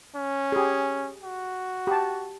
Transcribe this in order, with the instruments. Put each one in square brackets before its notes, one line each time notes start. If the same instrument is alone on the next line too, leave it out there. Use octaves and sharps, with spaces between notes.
[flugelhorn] C#4
[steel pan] G4 G#4
[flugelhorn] F#4
[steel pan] G4 A5